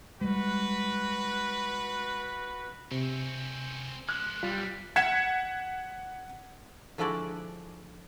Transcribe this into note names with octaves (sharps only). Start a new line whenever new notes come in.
G3 G#3 F#4 B4
C3 C4 C#4
C#2 F3 F#6
B1 F#2 G3 F4
F#5 G#6 B6 C#7 E7
D3 F3 G#3 E4 F#4 D5